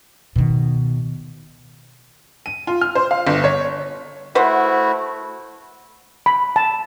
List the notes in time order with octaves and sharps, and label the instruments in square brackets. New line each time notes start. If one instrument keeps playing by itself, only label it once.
[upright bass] B2 D#3
[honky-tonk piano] D#7
F4
F6
C5
F5
G1
C#5
[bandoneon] A3 E4 F#4 [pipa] B4 C5 F#5
[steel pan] B5
A5